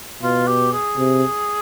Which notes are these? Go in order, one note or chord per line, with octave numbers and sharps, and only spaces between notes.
B2 F4
G4
G#4
C3